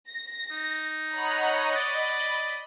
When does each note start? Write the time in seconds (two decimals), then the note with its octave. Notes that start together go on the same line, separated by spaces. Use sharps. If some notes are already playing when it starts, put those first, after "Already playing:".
0.10 A#6
0.51 D#4
1.12 C#5 D#5 F#5 A#5 B5
1.76 D5 D#5 B5